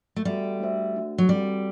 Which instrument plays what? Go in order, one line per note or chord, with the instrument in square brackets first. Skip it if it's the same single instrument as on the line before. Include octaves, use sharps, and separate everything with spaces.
[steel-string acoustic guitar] A3
[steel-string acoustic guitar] G3 [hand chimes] B3 F#4 A4 E5
[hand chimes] A3 D4 F#4 C5 E5
A3 D4 F#4
[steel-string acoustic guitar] F#3
[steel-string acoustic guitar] G3 [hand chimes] C4 F#4 A4